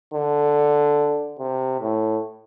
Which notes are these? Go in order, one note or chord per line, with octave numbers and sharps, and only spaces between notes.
D3
C3
A2